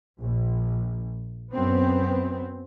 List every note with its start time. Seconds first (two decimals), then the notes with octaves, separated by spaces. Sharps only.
0.19 A#1
1.52 F#2 B3 C4